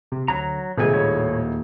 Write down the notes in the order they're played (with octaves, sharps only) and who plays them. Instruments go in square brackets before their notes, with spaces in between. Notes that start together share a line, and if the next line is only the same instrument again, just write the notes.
[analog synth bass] C3
[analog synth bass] D2 [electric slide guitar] F#3 A#5
[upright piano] D#1 G#3 [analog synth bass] D#2 [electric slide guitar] C3 G#5
[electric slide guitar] A2 C#5